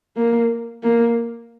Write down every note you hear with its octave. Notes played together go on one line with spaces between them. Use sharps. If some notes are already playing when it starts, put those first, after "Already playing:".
A#3
A#3